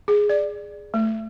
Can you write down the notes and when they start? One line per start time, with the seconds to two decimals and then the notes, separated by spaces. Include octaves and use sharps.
0.08 G#4
0.29 D5
0.94 A3